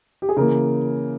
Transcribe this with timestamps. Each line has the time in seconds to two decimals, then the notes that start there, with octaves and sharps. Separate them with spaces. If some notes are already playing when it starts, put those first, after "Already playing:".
0.22 G4
0.29 G#4
0.37 C#3 E3 A#3 A#4